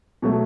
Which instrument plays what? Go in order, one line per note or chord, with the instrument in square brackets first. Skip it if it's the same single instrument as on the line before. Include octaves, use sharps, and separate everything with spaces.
[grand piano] B2 F#3 A3 F#4